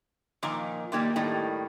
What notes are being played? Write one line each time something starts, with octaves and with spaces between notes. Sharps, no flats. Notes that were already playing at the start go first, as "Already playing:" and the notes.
A#2 D#3 F3 A#5 C6
A#2 D#3 G3 A#3 C6
A2 D#3 G3